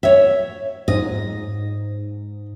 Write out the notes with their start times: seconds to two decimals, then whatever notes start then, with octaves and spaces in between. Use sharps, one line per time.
0.03 C#5 E5
0.88 G#2 D#5